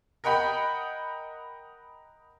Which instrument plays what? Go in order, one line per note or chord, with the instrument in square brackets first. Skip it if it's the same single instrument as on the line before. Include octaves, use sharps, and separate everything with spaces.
[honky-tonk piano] A#4 D#5 F#5 G5 B5